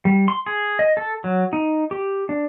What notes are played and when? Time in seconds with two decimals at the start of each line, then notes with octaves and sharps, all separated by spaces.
0.05 G3
0.28 C6
0.46 G#4
0.79 D#5
0.97 A4
1.24 F#3
1.53 D#4
1.91 G4
2.29 D4